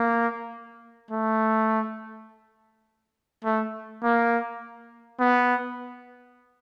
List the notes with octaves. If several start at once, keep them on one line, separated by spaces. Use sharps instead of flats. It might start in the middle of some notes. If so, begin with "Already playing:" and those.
Already playing: A#3
A3
A3
A#3
B3